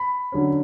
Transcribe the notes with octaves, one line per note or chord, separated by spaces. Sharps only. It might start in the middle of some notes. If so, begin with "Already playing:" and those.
Already playing: B5
D3 F#3 C#4